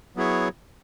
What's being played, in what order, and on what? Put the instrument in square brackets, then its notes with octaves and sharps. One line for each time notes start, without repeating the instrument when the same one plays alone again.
[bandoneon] F#3 B3 E4 G#4 C#5